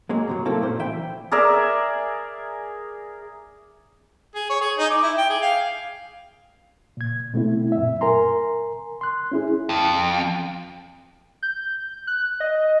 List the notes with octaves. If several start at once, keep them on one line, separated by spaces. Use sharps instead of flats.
F#3 G#3 A#3 C#4
F#2 C3 F#3
A3 A#3 C4 C#4 E4 A4
A#2 C5
E3 E5 G5 B5
G#4 A#4 D5 E5
G#4
C#5
G#4
D#4
D6
E4
G5
G#4
F5
A#2 G#6
B2 A3 C4 E4
F#2 A#2 E5
A#4 G#5 A#5 C6
C6 F#6
C#4 E4 G#4
F2
G6
F#6
D#5